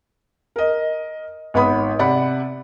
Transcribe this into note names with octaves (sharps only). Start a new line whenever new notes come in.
A#4 D#5
G#1 B3 C#5 B5 D#6
C3 D5 F#5 B5